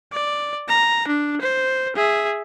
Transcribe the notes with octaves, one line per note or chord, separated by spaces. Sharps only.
D5
A#5
D4
C5
G#4 E5